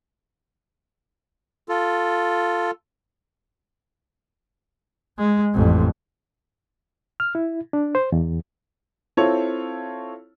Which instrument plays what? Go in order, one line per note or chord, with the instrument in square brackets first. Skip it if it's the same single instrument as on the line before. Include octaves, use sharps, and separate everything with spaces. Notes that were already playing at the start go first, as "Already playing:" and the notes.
[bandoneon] F4 A4
[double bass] G#3
A1 F2
[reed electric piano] F6
E4
D4
C5
E2
[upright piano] C4 E4 F4 A4 C#5